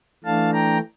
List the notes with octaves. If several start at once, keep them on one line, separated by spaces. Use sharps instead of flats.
E3 A3 D4 F5 A5
G5 A#5